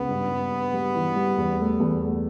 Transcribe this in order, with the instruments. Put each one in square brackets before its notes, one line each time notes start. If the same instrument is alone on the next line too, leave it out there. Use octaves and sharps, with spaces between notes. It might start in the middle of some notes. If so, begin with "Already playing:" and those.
Already playing: [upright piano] C#2 [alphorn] B3
[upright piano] G2
G2
G2
G3
E3
G3
E2
A3
E2
A3